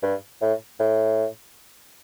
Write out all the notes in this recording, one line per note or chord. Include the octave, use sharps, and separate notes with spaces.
G2
A2
A2